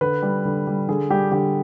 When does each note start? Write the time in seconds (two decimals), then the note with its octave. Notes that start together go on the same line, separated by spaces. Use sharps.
0.01 D3 B4
0.23 G3
0.45 D3
0.67 G3
0.88 D3 G#4
1.10 G3 G4
1.31 D3 G4